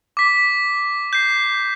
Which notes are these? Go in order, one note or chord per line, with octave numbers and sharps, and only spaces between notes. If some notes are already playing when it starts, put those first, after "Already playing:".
D6 B6
G6 C7